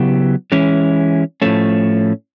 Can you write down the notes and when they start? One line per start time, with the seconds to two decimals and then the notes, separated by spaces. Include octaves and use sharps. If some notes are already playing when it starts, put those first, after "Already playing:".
Already playing: C#3 F#3 B3 E4 G4
0.52 E3 G#3 C#4 E4
1.42 A2 F3 A3 C#4